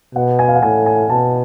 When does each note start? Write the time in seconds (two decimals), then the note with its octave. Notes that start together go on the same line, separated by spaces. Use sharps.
0.15 B2 F#5
0.39 G#5
0.48 F5
0.56 F#5
0.62 A2 G#5
0.86 G#5
1.10 B2 A5